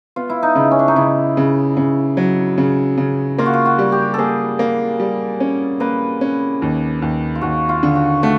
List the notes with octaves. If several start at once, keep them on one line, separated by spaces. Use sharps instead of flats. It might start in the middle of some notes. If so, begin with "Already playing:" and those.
B3 F4
E4
D#4
C#3 E4
C#4
D4
D#4
C#3 E4
C#3
C#3
F#3
C#3
C#3
A#3 F4
F#4
F4
F#4
G3
G4
A#3 G#4 A4
A#3
G3
C#4
A#3 B4
C#4
D#2
D#2
F4
D#2 F#4
F4
D3
F#4
A3 F#4